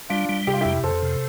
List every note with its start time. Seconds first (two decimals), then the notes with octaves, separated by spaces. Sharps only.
0.10 G3 D4 F4
0.29 G3
0.47 C3 G4
0.54 F4
0.61 F2 E4 G4
0.83 F2 A4 C5
1.02 C3